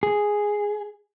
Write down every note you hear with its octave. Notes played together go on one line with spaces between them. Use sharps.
G#4